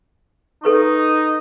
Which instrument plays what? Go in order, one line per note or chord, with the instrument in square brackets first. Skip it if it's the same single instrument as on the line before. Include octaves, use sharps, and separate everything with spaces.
[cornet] D#4 [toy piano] A4 B4 C#6